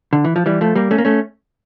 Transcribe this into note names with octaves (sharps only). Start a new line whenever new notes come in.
D3
E3
F3
E3 G3
F3 A3
G3 A#3
A3 C#4
A#3
A3 C#4